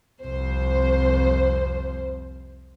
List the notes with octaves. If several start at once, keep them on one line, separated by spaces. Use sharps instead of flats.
C2 F2 C5